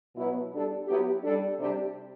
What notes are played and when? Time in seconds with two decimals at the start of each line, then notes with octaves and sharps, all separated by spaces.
0.16 B2 F#3 B3 E4 B4
0.51 G3 D4 A4
0.87 F#3 B3 E4 G4
1.23 G3 D4 A4
1.58 C3 G3 D4 G4